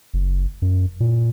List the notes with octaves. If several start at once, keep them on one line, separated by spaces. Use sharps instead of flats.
F#1
F#2
A#2